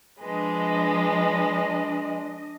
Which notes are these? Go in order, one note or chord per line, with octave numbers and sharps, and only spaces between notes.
F3 G#3 D4 B4 D#5